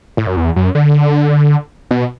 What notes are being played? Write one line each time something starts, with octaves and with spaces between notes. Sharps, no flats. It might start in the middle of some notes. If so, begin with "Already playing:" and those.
A2
F#2
E2
F#2
D3
B2